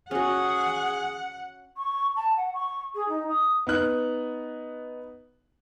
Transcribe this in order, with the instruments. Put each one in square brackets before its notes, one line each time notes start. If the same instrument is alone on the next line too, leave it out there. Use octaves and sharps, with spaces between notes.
[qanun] C#4 F#4 [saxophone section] G#4 [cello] F#5
[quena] C#6
A5
F#5
C#6
G#4
D#4
D#6
[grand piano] B3 D#4 F#6